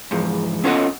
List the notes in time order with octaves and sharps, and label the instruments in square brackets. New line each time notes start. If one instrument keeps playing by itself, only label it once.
[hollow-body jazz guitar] E2 G#2 F3
B3 C#4 F4 A4 D#5 F#5